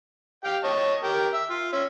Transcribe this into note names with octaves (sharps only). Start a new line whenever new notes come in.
G4 F5 G5
C#5 D#5 A5
G4 A#4
E5
F4
C#4 E5